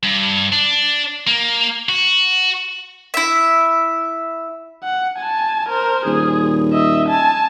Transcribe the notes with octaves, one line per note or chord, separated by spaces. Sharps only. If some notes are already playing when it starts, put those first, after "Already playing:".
G2
D4
A#3
F#4
E4 E5
F#5
G#5 A5
A#4 C5
D#1 G#4
D#5 E5
G#5 A5